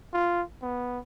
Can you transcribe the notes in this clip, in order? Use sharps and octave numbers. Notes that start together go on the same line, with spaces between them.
F4
B3